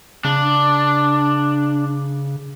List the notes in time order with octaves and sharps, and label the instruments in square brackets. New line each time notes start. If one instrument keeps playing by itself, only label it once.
[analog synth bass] C#3 [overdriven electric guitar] D4